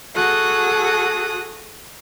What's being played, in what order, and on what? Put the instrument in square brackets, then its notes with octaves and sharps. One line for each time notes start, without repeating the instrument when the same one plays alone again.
[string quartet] F#4 G#4 A4 D#6 F#6